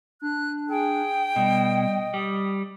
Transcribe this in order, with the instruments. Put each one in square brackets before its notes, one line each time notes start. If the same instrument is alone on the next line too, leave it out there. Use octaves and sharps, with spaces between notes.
[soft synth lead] D4 [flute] F#6
[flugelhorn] G#4 [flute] G5
[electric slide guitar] B2 [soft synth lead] G3 [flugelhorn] D#5
[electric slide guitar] G3 [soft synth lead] D#6